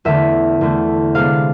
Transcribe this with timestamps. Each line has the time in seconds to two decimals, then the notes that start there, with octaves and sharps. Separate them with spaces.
0.05 E2 D3 A3 E5
0.61 E2 D3 A3
1.15 C3 G#3 B3 D4 F5